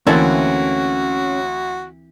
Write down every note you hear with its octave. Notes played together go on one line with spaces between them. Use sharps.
D2 E3 A#3 C4 C#4 F#4 A4 G#6